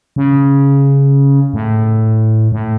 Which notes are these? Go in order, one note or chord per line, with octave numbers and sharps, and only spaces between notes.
C#3
A2
A2